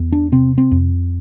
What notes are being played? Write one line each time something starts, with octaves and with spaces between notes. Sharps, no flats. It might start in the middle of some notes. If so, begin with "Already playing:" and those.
Already playing: E2
D4
C3 C4
C4
F2